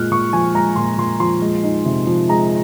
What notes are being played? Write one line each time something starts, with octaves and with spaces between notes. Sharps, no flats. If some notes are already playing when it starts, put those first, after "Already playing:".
Already playing: A#2 G#3 F6 F#6
A#2 C#6
F3 G#5
G#3 A#5
A#2 C6
A#2 C6
F3 C6
G#3
D#4
C3
F3
G#3 A#5